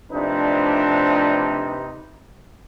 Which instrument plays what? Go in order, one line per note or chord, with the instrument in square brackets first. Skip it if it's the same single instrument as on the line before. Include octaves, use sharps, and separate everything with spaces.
[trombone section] C3 D#4 B4 [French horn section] F3 A3 D4